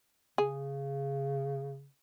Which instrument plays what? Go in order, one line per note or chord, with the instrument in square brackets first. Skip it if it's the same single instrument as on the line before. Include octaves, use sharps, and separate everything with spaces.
[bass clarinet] C#3 [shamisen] G#4